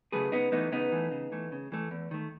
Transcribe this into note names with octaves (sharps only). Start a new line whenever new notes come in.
C#3 F#3 A3 G#4 B4
C#3 B3 D#4
E3 A3 B3 D#4
C#3 B3 D#4
E3 A3
C#3
E3 A3
C#3
E3 A3
E2
D#3 A3